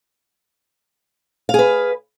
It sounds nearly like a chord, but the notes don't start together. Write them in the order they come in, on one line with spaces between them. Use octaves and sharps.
F5 G#4 B4